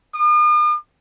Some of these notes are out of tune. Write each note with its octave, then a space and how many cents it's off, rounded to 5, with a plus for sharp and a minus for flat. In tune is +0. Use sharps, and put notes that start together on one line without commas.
D#6 -45